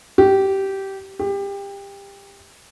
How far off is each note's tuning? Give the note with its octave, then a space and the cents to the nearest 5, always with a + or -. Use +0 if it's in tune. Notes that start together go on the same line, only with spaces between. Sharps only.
G4 -15
G4 +25